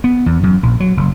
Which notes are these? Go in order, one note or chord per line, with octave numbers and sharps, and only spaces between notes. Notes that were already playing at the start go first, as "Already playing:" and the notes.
B3
E2
F#2
A#1
F#3
F#1